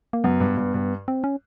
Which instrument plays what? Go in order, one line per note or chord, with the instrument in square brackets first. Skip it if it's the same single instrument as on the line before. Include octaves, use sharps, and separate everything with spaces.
[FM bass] A#3
[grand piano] F#2 [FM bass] B3
[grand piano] G2
G2
G2
[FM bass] C4
C#4